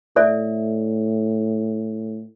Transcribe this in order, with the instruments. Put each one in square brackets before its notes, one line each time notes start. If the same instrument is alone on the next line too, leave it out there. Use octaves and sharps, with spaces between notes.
[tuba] A2 [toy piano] A4 D5 E5